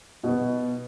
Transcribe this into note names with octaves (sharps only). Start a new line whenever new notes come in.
B2 B3